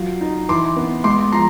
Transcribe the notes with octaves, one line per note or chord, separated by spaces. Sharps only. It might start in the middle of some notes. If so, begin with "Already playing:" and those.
Already playing: F#3 F4
D#4
E3 C6 D6
B3
G#3 C6 D6
F3 A#5 C6